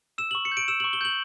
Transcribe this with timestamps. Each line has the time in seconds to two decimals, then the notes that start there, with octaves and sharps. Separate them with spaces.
0.18 E6 E7
0.31 C#6 F#7
0.45 C#7
0.52 G6
0.57 D7
0.68 E6 E7
0.80 C#6 F#7
0.93 G7
1.01 G6 F#7